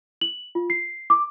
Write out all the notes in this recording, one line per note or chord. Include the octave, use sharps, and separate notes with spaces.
F#7
F4
C7
D6